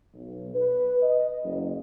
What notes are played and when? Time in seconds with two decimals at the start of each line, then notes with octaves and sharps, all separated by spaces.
0.14 B1
0.55 B4
1.02 D#5
1.43 F#1